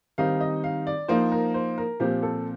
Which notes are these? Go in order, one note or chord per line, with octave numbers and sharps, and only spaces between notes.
D#3 G3 C4 D#4 F5
D#5
F5
D5
F3 A#3 D#4 C5
A#4
C5
A#4
A#2 F3 C4 G4
A4